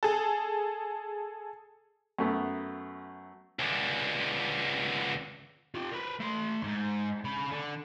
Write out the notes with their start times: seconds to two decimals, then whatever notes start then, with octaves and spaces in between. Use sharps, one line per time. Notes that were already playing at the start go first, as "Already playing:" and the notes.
0.03 G#4 A4
2.19 F#2 A3 B3
3.59 C#2 D3
5.75 F4 G4
5.91 A#4 B4
6.19 A3 C6
6.63 G#2
7.24 C#3 B5
7.51 D3